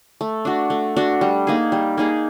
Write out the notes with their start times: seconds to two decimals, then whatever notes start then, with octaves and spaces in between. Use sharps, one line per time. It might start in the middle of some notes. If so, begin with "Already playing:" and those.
0.21 A3
0.45 D4 F#4
0.70 A3
0.96 D4 F#4
1.21 G3
1.47 A#3 D#4 G#4
1.72 G3
1.98 A#3 D#4 G#4